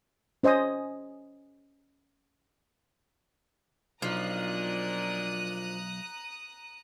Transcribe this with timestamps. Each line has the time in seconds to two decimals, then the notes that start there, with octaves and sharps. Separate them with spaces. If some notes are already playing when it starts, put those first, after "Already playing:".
0.43 C#4 C5 D#5 G#5 D#6
4.02 B1 A#2 F3 D4 A#5 D#6 F#6